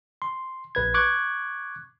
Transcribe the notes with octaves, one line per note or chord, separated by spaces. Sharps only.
C6
A#1 B4 G#6
C#6 D6 F#6 G#6